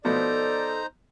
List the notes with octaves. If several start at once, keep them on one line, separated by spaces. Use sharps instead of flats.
B2 F3 B3 D#4 A4 C5 D5 A#5